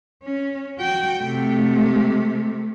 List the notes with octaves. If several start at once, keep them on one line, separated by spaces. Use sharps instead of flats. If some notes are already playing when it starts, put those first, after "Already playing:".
C#4
F#4 G5
C3 A3